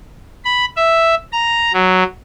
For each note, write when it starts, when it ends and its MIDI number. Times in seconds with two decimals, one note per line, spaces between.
0.45 0.65 83
0.76 1.15 76
1.32 1.72 82
1.74 2.04 54